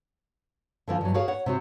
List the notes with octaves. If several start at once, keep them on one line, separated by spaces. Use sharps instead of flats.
D3 E3 F3 F4
G2 E3 F#3
F#4 G#4 A#4 B4 C#5 F5
C#5 F#5
C3 C4 F#4